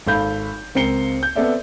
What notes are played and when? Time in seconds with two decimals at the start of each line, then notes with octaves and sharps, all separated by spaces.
0.07 G#1 A4 F5 B5 G6
0.75 C#2 C4 A#4 C7 C#7 G7
1.23 G6
1.36 B3 C4 A4 D5 E5